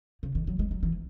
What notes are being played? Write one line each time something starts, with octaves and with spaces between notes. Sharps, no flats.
C#3
D#3
F#3
G#3
F#3
E3